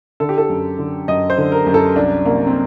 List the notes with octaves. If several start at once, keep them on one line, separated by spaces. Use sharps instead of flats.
D3 A4
G4
A4
F#2
D3
F#2 D#5
C5
D3
A#4
F#2
A4
C2 D4
C2 A#3
C4